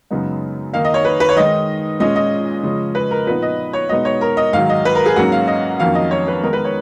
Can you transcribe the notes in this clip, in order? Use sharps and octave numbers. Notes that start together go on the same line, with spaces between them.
F#2 C#3 G#3 B3 D#4
D#3 A#3 D#4 F5
D#5
C#5
B4
B4
C#5
D#3 G#3 D#4 D#5
A#2 G#3 C#4 D#5
D#5
C#3 F3 G#3 C#4
B4
A#4
A#2 F3 B3 D#4 B4
D#5
C#5
B2 G#3 B3 D#4 D#5
C#5
A#4
D#5
G#2 D#3 F#3 F5
D#5
B4
A#4
G#4
G#2 F#3 A#3 C#4 F#4
F5
D#5
F2 D#3 F#3 A#3 C#4 F5
D#5
C#5
B4
D#3 G#3 B3 D#4 A#4
B4
C#5